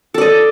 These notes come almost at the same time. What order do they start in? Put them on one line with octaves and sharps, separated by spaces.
A4 D5 D#5